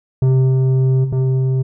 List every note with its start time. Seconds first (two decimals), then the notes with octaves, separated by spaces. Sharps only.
0.22 C3
1.12 C3